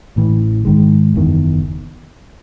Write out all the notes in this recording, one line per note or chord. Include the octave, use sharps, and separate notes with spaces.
A1 A2 E3
G#2 D#3 G#3
F#1 E2 D#3